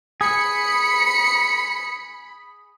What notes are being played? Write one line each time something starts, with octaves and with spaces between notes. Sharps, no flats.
G#4 B5 C#7